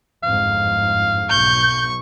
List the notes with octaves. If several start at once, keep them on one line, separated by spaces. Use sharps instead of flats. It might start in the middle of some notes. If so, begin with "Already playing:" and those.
G1 F2 G#2 F5
B1 C#6 G6